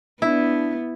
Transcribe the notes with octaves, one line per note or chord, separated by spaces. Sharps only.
B3 D4 E4